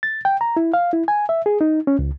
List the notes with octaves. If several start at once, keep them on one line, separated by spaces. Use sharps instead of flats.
A6
G5
A#5
E4
F5
E4
G#5
E5
G#4
D#4
C#4
C#2